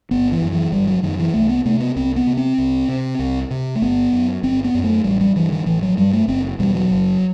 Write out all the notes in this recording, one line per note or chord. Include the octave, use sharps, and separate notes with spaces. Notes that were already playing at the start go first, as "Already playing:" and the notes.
G1 B3
E3
F#2
E3
G1 G3
F#3
F#2 D#3
E3
C2 A3
B3
C3 A3
B3
C2 C4
B3
C3
C4
C2
C3
C2
C3
A3
G1 B3
F#2
G1 C4
B3
F#2
A3
A1 G3
G3
G2 E3
D#3
A1 E3
F#3
G2 G3
A3
F#1 C4
E2 B2 G3
F#3
F#1